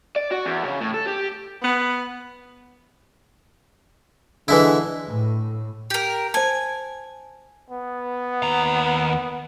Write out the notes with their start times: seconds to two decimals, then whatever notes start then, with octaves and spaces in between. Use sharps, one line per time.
0.16 D5
0.31 F#4
0.46 E2
0.65 C#3
0.81 A2
0.94 A4
1.07 G4
1.62 B3
4.48 D3 E3 G#3 E4
5.08 A2
5.90 G4 A#4
6.34 C5 G#5 A5
7.71 B3
8.43 D#2 A#5